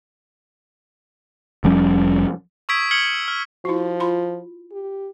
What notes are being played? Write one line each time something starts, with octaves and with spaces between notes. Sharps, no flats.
F1 F3 G3 C#4
C#6 D#6 E6 G#6 B6 D7
F6 G#6 C#7 F#7 G7
F6
F3 E4 F#4
F4 B5 C6
G4